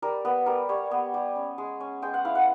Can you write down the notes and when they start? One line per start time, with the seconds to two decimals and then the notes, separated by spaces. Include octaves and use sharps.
0.02 G3 A#4
0.25 B3 B4
0.46 G3 A#4
0.69 G3 C#5
0.91 B3
1.14 G3
1.36 C#4
1.58 G#3
1.80 C#4
2.02 G#3 G5
2.14 F#5
2.25 E4 F5
2.35 F#5